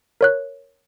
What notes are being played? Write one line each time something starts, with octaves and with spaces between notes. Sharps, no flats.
A#4 C#5 F#6